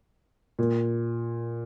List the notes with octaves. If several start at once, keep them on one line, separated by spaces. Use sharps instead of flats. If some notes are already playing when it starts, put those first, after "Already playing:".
A#2